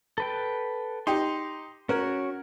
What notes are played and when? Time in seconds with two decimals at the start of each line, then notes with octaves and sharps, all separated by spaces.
0.18 A4 B4 G5
1.07 D#4 G4 C6
1.89 C#4 F#4 A#4 C#5